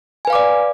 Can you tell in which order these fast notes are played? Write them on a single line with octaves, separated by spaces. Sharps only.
G#5 B4 F5 D6 D5